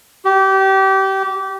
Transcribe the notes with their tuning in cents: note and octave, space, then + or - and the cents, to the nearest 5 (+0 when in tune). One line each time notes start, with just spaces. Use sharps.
G4 -25